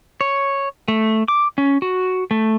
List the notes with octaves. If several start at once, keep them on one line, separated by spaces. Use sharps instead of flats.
C#5
A3
D6
C#4
F#4
A3